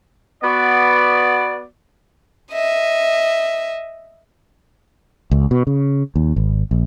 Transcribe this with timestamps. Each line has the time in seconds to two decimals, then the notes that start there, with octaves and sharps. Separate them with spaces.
0.43 B3 F#4 D5
2.52 D#5 E5
5.31 C#2
5.51 B2
5.67 C#3
6.16 D#2
6.36 G#1
6.71 A#1